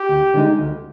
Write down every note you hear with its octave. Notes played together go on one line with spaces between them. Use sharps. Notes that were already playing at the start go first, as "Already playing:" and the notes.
Already playing: G4
D2
D3 G#3 D#4
D2